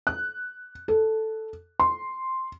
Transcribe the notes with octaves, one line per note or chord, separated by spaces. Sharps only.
F#6
A4
C6